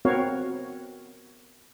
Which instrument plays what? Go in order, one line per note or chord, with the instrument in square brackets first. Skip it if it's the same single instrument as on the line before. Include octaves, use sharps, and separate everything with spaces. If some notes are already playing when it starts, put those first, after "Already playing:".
[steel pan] B3 C4 F#4 A#4 C#5 F5